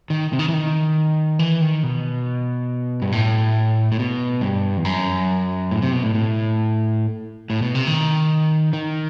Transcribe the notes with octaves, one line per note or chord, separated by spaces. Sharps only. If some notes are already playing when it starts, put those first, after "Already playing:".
D#3
C3
D#3
E3
D#3
E3
D#3
B2
G2
A2
A2
B2
G2
E2
F#2
A2
C3
B2
A2
A2
A2
B2
C3
D#3
D#3